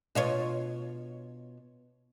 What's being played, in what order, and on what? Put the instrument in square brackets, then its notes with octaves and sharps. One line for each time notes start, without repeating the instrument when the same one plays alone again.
[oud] B2 F4 C#5